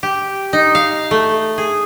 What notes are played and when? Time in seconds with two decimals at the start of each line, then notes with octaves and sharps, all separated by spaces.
0.03 G4
0.53 D#4
0.75 F5
1.11 A3
1.58 G#4